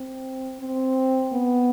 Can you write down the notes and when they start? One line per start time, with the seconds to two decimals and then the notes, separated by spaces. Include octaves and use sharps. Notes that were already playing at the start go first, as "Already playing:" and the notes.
Already playing: C4
0.60 C4
1.32 B3